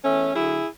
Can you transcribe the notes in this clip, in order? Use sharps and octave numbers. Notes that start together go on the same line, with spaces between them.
E2 A3 C#4
D3 F#3 E4 G#4